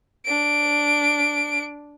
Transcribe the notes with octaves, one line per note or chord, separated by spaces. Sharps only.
D4 D7